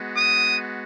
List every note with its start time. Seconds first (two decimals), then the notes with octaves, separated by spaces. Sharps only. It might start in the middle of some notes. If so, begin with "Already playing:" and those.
Already playing: G#3 B3 F#4
0.16 D#6